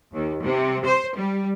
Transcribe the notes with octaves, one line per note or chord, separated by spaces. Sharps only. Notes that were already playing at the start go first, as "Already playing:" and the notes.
D#2
C3
C5
G3